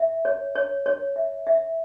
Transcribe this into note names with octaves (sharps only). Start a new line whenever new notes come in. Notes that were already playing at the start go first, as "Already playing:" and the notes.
Already playing: E5
C#5
C#5
C#5
E5
E5